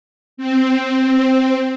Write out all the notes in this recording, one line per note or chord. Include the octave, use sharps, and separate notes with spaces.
C4